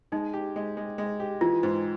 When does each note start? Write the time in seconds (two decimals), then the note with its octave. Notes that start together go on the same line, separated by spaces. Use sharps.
0.12 G#3 D#4
0.33 G4
0.56 G#3
0.77 G#3
0.98 G#3
1.20 G4
1.41 E3 F4
1.63 G#2